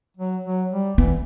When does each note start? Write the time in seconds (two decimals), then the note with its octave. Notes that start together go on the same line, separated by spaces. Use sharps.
0.17 F#3
0.44 F#3
0.71 G3
0.98 E3 B3